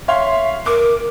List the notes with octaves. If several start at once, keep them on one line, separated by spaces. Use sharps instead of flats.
C#5 E5 F5 C6
A#4 D6